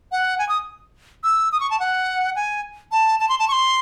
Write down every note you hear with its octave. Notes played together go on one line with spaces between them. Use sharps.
F#5
G#5
D#6
E6
D#6
C#6
A5
F#5
G#5
A5
A5
C6
A5
C#6
C6